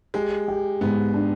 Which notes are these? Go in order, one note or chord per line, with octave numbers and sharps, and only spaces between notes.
G#3 G4
G4
G#2 B3
D4